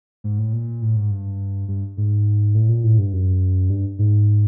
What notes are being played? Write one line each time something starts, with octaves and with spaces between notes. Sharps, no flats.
G#2
A2
A#2
A2
G#2
G2
G2
G#2
A2
A#2
A2
G2
F#2
G2
G#2